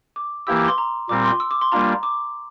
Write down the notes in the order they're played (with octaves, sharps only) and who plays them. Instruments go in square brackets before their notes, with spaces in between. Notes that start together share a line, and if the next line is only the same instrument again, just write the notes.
[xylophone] D6
[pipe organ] E3 A#3 E4 G4 [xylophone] E6
[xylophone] D6
C6
A#5
[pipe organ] A#2 G3 C4 [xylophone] D6
[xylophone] C6
E6
D6
C6
[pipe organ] G3 A#3 D4 F4 [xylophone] A#5
[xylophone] D6